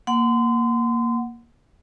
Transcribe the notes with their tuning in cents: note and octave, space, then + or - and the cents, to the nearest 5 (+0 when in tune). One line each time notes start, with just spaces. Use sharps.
A#3 +0 F#5 +0 C6 -30